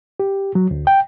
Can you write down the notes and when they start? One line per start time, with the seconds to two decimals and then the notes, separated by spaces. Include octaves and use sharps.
0.20 G4
0.55 F#3
0.71 D2
0.87 G5